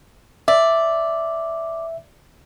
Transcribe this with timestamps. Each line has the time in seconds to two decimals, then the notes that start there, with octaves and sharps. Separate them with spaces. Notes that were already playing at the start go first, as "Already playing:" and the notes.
0.48 D5 E5